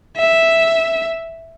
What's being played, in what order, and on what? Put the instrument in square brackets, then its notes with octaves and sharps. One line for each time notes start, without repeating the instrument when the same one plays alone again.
[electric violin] E5